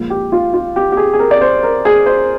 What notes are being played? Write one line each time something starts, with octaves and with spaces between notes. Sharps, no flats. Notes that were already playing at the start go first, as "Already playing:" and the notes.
Already playing: A#2 F3 G#3
G4
F4
F4
G4
G4
G#4
G#4
A#4
D5
C5
A#4
G#4
C5